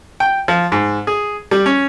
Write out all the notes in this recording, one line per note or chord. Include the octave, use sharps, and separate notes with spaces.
G5
F3
G#2
G#4
G3
C#4